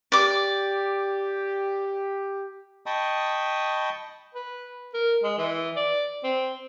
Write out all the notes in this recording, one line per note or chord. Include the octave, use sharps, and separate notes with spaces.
G4 D5 D6
D#5 G5 A5 B5 C#6 D#6
B4
A#4
G#3
E3
D5
C4